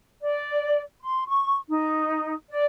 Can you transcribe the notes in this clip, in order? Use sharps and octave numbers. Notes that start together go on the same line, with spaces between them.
D5
C6
C#6
D#4
D5